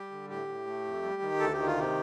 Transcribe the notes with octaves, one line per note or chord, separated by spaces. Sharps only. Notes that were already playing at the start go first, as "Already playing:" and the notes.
Already playing: G3 G4
D3
A2 G4
A2
A3
F2
G3
D#3
D2 A4
D#3 G4
F4
C3 G4